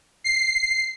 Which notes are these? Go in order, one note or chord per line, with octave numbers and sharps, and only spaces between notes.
C7